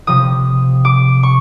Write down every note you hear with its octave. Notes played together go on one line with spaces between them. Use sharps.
C3 F3 D#6
D6
C#6